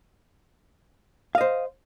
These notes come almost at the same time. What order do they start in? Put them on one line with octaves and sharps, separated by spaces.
F5 D#5 C5